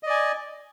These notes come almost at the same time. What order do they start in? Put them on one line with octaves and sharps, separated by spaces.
D#5 D5 G#5